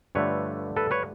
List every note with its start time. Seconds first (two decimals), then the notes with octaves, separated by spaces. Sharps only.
0.15 G2 D3 F3 A3 B4 C#5
0.77 A4 B4
0.91 B4 C#5